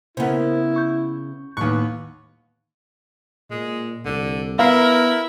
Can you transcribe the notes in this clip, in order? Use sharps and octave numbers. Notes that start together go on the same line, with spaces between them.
C#3 B3 E4 A#4 C5
C#6 G6
D#2 A2 B3 C#6 F#6
A#2 G#3
C2 D3
B3 E4 A#4 F5